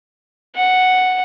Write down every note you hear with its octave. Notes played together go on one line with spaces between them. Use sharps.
F#5